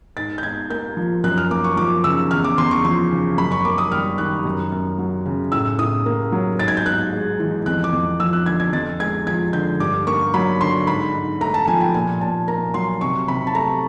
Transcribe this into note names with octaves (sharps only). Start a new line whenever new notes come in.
G#2 A6
G6
G#2 G#6
A#3 G6
F3
F#2 F#6
F6
A#3 D6
C#6
F3 D6
C#3 E6
E2 F6
D6
E2 C6
C#6
F3 C6
C#3
F#2 B5
C#6
A#3 D6
D#6
G3 F6
D#3 F#6
F#2
F#2
F#3
C#3
A2 E6
A2 D#6
A#3
F#3
G#2 A6
G#6
G6
G#2 F#6
G#3
E3
F2 F#6
D6
F2
F3 E6
F#6
D3 G#6
G#6
F2 A6
G#3 G#6
F3 G#6
D3 G6
G2 D6
A#3 C#6
F#3 B5
D3 C6
G#2 B5
G#2
A3 A#5
A5
F3 G#5
G5
A#2 G#5
A#2 A5
A#3 A#5
F#3 C6
C3 C#6
C3 B5
A5
A3 A#5